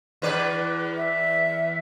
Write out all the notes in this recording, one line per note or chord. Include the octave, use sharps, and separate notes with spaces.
E2 B4 D5
E5